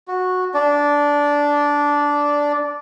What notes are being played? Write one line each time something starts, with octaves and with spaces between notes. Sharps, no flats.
F#4
D4 D5